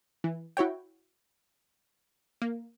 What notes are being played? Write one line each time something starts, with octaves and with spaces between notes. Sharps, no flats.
E3
E4 F#4 C#5 G5
A#3